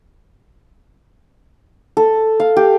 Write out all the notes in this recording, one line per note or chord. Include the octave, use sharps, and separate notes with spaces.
A4
F5
G4